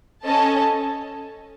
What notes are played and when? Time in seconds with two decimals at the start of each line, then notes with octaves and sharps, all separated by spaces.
0.23 C#4 A4 D#5 A5